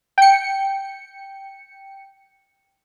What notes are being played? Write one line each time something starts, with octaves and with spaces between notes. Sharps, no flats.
G5 C#7